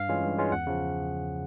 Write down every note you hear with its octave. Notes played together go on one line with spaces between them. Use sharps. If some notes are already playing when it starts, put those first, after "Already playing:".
Already playing: G2 F5
E3 G#3 C#4 F4
G2
E3 G#3 C#4 F4
E2 F#5
C#3 F3